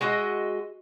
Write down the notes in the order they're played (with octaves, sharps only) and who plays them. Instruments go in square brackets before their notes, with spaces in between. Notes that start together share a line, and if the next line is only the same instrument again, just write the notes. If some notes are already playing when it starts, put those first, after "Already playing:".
[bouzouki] G#3 F#4 D#5 E5